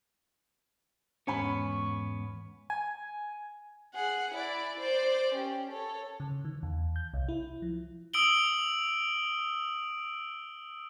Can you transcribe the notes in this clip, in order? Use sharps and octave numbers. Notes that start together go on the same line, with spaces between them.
E2 G#2 B3 C#4 G#5 B5 C#6
G#5
G#4 F#5
E4 D5
C5 D5
C#4 G4
A4 C#5
C#3
D#3
E2
G6
C2
E4
F3
D#6 E6 D7 F#7 G7